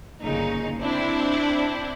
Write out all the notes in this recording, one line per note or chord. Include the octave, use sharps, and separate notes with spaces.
G1 A#2 C#3 D#4
C4 D4 E4